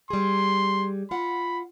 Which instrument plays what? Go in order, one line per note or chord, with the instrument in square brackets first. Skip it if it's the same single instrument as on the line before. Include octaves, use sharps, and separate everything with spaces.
[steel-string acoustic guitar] G3 G#4 [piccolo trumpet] C6
[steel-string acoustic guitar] F4 F#5 [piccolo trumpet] B5